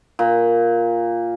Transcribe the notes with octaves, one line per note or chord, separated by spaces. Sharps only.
A#2